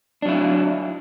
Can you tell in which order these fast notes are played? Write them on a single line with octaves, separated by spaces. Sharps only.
D4 F#3 E4